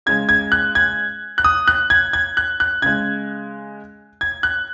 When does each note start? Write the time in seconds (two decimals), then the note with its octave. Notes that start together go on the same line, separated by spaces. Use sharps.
0.06 C#3 G#3 G#6
0.29 G#6
0.52 F#6
0.75 G#6
1.38 F#6
1.44 D#6
1.68 F#6
1.90 G#6
2.13 G#6
2.37 F#6
2.60 F#6
2.82 C#3 G#3 G#6
4.21 G#6
4.43 F#6